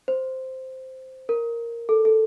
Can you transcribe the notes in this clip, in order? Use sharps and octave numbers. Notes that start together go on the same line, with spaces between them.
C5
A#4
A4
A4